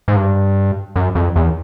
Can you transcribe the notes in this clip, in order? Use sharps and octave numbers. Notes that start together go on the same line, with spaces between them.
G#2
G2
F#2
F2
E2